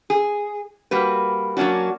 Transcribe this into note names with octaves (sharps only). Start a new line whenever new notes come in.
G#4
G3 A#3 F#4 B4
F#3 A#3 C#4 D4 F#4